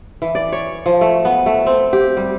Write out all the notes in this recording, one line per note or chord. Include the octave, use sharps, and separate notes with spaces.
E3
D5
C#5
F3
A3
B3
A3
C4
G4
G3